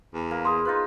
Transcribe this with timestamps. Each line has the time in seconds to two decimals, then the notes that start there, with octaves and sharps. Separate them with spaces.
0.14 E2
0.31 A#3
0.45 G#4 C6 D#6
0.65 D#4 F4 B4